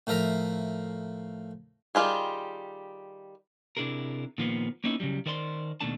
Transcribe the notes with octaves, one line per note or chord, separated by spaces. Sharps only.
A2 F3 A#4 E5 A#5
D#3 G3 F4 G4 G#4
C3 D4 E4 G#4 A#4
A#2 D#3 F3 A#3 B3
A#3 B3 C#4 D#4 E4
C#3 E3 F#3 G3
D#3 A#4 C5 D5 B5 C6
D#2 B2 D#3 A3 D4 A5